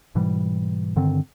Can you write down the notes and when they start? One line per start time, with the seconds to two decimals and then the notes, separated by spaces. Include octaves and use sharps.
0.15 G#2 B2 E3 G3
0.96 G2 D3 D#3 C4